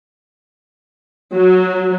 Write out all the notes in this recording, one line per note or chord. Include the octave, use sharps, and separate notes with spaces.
F#3